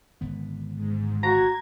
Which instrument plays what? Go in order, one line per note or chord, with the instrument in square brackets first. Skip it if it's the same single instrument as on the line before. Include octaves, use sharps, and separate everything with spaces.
[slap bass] G#1 D3 B3
[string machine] G#2
[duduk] F#4 [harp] A#5 [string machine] G#6